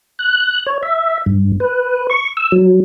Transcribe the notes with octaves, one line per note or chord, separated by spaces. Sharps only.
F#6
C#5
E5
G2
B4
C#6
E6
F#3